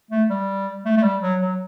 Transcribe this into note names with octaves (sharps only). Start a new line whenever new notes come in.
A3
G3
A3
A3
G3
F#3
F#3